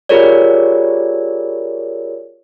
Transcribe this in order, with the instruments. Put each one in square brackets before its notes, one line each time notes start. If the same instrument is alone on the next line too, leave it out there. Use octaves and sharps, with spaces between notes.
[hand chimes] F4 G4 G#4 A#4 C#5 D5